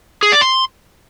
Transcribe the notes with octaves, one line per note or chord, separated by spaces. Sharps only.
G#4
D5
C6